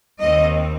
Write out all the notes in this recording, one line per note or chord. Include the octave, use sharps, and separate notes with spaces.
D#2 D#3 C4 D#5